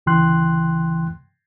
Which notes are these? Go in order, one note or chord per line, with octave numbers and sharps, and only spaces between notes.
D2 C#3 E3 G5 C6 F#6